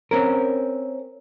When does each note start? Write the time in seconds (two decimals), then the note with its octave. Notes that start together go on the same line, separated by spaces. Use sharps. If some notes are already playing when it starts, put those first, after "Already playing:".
0.11 C4 C#4 A#4